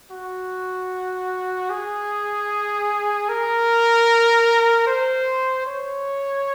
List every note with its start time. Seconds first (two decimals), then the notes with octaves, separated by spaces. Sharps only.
0.11 F#4
1.70 G#4
3.29 A#4
4.87 C5
5.67 C#5